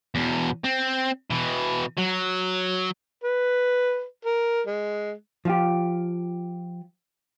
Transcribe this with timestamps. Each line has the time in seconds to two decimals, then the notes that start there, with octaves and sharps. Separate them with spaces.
0.15 E2 B2
0.64 C4
1.30 B2 E3
1.97 F#3
3.24 B4
4.25 A#4
4.67 G#3
5.45 F3 F4 G4